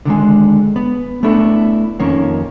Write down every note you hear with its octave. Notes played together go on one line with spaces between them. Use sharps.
D3 D#3 F#3 G#3
B3
A3 B3 D4 E4 A4
F2 D#3 A#3 C#4